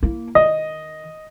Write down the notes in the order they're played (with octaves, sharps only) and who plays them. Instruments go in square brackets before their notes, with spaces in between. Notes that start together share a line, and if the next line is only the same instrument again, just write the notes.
[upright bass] A#3 E4
[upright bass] D#3 [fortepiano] D#5